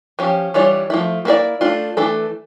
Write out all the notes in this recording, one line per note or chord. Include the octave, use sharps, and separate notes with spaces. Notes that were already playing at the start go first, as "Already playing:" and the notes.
F3 C#4 G4
E3 G3 D4 F4 C#5
F3 A3 E4
A#3 E4 A#4 D5
A3 D4 F4
E3 A3 D4 A4